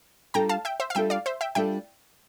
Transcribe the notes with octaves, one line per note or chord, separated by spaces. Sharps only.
G3 D4 F4 A4 G5 A#5
F5 A5
E5 G5
C5 E5
F5
G3 D4 F4 A4 E5 G5
D5 F5
C5 E5
E5 G5
G3 D4 F4 A4 E5 G5